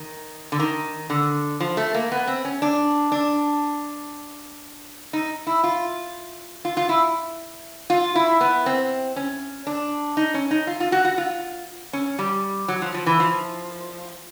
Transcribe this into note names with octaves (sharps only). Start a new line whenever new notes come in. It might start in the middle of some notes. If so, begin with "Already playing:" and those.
Already playing: D#3
D3
D#3
D3
F3
A3
A#3
B3
C4
C#4
D4
D4
D#4
E4
F4
F4
F4
E4
F4
E4
B3
C4
C#4
D4
D#4
C#4
D#4
F4
F4
F#4
F#4
F4
C#4
G3
F#3
F3
F3
E3
F3